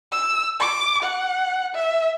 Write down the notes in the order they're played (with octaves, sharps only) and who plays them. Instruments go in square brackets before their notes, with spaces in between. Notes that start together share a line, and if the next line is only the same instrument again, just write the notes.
[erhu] E6
D6
F#5
E5